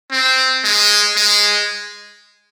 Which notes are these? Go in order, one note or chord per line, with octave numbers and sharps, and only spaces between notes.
C4
G#3
G#3